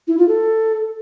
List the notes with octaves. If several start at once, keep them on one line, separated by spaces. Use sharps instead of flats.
E4
F4
A4